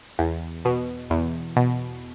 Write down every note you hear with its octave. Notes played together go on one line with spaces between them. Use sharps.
E2
B2
E2
B2